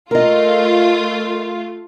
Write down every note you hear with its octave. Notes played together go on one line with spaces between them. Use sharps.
A3 F4 A#4 D#5